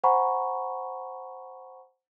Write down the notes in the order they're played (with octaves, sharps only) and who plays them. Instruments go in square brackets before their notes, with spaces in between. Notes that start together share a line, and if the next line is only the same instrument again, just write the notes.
[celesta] C5 F#5 G#5 A#5 B5 C#6